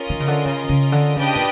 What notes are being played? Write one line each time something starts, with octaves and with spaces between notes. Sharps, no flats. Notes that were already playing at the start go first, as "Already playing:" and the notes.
Already playing: C#4 F4 A#4 D#5
D#3
C#3
D3
C#3
C#3
D3
C#3 D4 G4 B4 D#5 G5
A#2